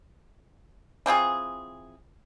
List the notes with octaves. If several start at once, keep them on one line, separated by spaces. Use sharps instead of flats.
E3 C4 F4 G#4